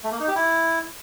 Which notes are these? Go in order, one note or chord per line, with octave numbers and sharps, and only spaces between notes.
A3
A#3
D#4
G4
E4